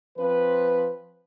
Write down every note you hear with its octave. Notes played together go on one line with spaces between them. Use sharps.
F3 C4 B4